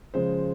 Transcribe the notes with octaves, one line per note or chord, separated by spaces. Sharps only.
C#3 F3 G#3 C5